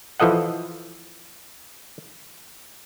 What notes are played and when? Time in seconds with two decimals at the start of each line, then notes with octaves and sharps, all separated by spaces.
0.20 E3 F3 A4 D#5 F#5